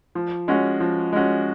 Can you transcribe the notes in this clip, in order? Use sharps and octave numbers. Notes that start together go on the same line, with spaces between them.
F3
G#3 C#4 F#4
F3
G#3 C#4 F#4